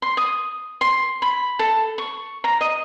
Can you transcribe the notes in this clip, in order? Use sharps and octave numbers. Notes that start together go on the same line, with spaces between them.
C6
D#6
C6
B5
A4
C#6
A#5
D#5